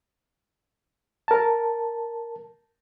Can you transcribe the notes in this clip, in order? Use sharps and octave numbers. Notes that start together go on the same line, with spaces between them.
A#4 A5